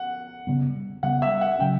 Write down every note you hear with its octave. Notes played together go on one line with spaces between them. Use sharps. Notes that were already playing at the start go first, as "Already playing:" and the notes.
Already playing: F#5
C#3 G3 B3
C#3 G3 B3 F#5
E5
F#5
C#3 F#3 C#4 G5